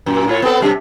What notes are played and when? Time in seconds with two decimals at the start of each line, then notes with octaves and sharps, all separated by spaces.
0.06 F#2 A#2
0.27 A2 F4 C#5
0.42 B3 C4 A4
0.61 C3 G3 D4